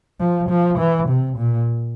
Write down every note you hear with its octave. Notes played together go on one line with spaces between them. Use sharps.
F3
F3
E3
C3
A#2